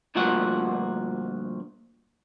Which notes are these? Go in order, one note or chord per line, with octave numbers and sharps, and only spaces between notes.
D2 G2 A#2 F3 F#4 F#5